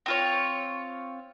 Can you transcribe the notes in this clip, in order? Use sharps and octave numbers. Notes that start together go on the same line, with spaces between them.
C4 F4 C#5